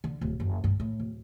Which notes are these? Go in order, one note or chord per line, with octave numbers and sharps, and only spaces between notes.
D3
D1
F#1
G2
A2
D1